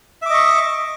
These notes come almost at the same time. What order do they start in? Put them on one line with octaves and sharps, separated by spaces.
E5 D6 D#5 C#6